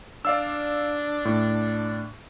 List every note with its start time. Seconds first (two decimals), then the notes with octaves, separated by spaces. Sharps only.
0.25 D4 D5 F5 E6
1.25 A2